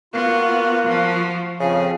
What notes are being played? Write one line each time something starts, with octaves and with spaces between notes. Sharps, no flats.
A#3 B3 F4 F#4
F3
F2 C#3 F3 G#4